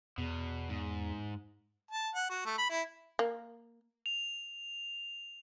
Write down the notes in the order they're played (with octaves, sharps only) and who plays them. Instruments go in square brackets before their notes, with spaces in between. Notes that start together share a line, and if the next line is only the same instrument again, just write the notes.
[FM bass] E2 [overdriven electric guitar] B2
[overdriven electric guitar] G#2
[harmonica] A5
F#5
F#4
A3
B5
E4
[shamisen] A#3
[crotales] F7